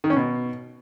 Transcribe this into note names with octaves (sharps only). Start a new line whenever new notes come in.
D#3
C#4
B2